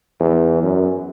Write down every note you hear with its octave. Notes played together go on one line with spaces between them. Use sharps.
E2
F#2